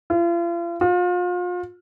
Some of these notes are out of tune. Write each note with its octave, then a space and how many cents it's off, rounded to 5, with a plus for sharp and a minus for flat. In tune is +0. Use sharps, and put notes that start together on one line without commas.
F4 -40
F4 +35